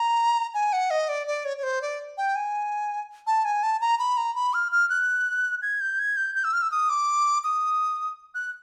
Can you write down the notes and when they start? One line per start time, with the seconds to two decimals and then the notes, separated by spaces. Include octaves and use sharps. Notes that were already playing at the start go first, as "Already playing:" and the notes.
Already playing: A#5
0.54 G#5
0.73 F#5
0.91 D#5
1.09 D5
1.27 D5
1.45 C#5
1.58 C#5
1.63 C5
1.82 D5
2.18 G5
2.36 G#5
3.27 A5
3.45 G#5
3.63 A5
3.81 A#5
3.99 B5
4.17 A#5
4.35 B5
4.54 F6
4.72 F6
4.90 F#6
5.62 G#6
5.81 G6
5.99 G#6
6.17 G6
6.35 G6
6.44 E6
6.53 F6
6.62 E6
6.71 D#6
6.90 D6
7.44 D#6
8.35 F#6